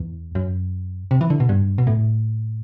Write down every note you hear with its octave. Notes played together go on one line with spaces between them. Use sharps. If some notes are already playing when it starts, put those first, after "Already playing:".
Already playing: E2
F#2
C3
E3
D3
B2
G2
B2
A2